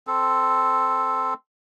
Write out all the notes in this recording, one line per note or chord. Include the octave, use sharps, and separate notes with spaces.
C4 A4